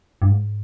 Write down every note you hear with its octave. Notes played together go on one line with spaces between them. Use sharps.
G2
G#2